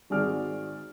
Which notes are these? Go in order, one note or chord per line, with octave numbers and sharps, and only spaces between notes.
G#1 D#3 F#4 G#4 D5 F6